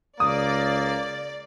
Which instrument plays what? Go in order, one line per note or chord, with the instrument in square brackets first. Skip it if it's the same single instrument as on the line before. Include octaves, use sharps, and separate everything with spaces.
[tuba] C#2 [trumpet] A#3 [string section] D5 [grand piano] D#6